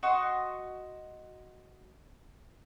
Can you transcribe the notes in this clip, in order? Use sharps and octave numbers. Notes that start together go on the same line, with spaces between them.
F#4 D#5 C6 C#6